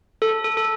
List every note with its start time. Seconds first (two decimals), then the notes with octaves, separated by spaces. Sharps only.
0.22 A4
0.44 A4
0.57 A4